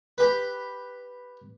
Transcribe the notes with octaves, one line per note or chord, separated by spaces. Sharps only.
G4 B4